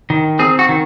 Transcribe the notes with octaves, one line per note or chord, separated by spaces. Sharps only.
D#3
C4 G#4
F#4
D#3